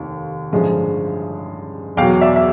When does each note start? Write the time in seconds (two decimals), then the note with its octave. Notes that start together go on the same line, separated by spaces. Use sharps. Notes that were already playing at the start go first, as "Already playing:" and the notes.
Already playing: F1 D#2
0.52 A1 G2 D3 F3 G#3
1.97 E2 B2 F#3 F5 G5
2.21 D5 E5
2.36 E5